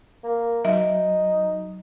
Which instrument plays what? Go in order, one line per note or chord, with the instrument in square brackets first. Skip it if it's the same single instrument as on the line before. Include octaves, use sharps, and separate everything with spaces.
[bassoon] A#3
[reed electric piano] F#3 [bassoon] D#4 [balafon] E5